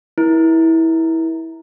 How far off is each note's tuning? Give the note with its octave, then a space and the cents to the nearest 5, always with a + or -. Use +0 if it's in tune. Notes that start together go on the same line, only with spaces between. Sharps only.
E4 -20 A#4 +40